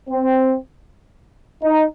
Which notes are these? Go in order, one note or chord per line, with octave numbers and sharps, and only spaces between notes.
C4
D#4